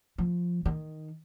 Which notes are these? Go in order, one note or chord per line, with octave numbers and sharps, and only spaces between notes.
F3
D#3